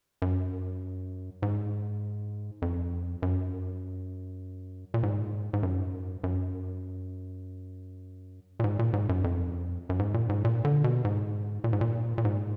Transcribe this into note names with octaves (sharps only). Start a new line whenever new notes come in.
F#2
G#2
F2
F#2
A#2
G#2
G#2
F#2
F#2
A#2
G#2
A#2
G#2
F#2
F2
F#2
G#2
A#2
G#2
A#2
D3
B2
G#2
A#2
G#2
A#2
A#2
G#2